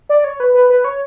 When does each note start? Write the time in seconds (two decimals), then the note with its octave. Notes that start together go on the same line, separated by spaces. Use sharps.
0.09 D5
0.24 C#5
0.40 B4
0.54 B4
0.70 B4
0.84 C#5